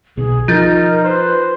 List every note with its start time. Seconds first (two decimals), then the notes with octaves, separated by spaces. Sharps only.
0.17 B1 G#4
0.48 F3 D#4 F4 A#4 G6 A6
1.04 B4 C5